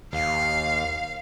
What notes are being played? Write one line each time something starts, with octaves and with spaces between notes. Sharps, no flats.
D#2 F5